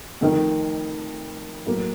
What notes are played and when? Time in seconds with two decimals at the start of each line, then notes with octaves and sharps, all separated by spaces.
0.21 F2 D#3 A3 D#4 A#4
1.66 A2 F#3 A#3